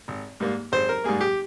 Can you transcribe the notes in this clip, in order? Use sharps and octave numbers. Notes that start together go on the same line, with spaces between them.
G#1
G#2 G3 A#3
G#1 C5
A#4
G#2 G3 A#3 G#4
G4